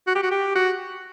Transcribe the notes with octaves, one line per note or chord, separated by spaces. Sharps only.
F#4
G4
F#4
G4
F#4